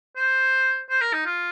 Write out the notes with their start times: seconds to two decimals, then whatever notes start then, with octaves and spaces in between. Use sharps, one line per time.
0.16 C5
0.90 C5
1.01 A#4
1.13 D#4
1.25 F4